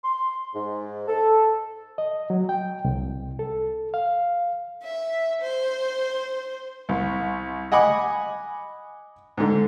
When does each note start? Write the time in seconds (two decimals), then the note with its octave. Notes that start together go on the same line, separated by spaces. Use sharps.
0.03 C6
0.54 G#2
1.07 A4
1.98 D#5
2.30 F#3
2.49 G5
2.85 C2
3.39 A4
3.94 F5
4.83 E5
5.41 C5
6.89 C2
7.72 D#5 F#5 G#5 B5 D6
9.37 G#2 D3